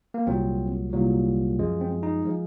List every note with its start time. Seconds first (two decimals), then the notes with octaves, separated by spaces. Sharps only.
0.14 A#3
0.26 C2 A#2 F#3 C4
0.93 C2 A#2 F#3
1.59 F#2 F3 G#3
1.81 C4
2.03 D#4
2.25 F3 G#3